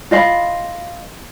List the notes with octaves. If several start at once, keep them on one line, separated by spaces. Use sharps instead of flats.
F4 D#5 F5 B5